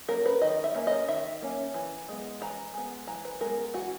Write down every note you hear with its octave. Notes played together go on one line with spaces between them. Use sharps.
A#3 C#4 A#4
B4
D#3 D#5
E5
A#3 C#4
D#5
D#3 E5
A#3 C#4
E3
G#3 B3
E3 A#5
G#3 B3
E3 A#5
B4
G#3 B3 A#4
E3 F#4